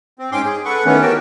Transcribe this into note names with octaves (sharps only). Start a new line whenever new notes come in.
C4
G#2 C#4 G5 C6 D6
G#4
A4 B4 F#5 C#6
D#3 E3 A3 B3 C#4
F#4 G4 A#4 G5 A5